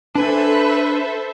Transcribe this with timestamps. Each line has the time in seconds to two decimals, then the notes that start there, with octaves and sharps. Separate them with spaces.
0.15 D4 A4 B4 C5 E5 G#5